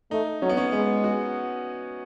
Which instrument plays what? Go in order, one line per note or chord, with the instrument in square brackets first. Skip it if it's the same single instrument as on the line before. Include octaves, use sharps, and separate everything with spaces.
[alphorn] A3 [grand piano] D#4
[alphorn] F#3 [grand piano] C#4
[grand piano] B3
C#4
[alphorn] G#3 [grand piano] B3
[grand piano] F#4